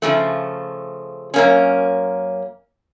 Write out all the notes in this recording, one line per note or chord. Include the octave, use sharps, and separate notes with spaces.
C#3 F3 A3
F#2 A#3 C#4